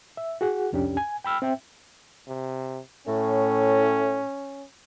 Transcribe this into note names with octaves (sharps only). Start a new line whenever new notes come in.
E5
F#4 G#4 F#5
C2 F2 C#4 D4 G4
G#5
G5 B5 E6 F6
C4 E5 G5
C3
A2 C#4